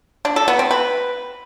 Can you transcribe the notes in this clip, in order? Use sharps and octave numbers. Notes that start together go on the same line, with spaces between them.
D4
A4
B3
C4
B4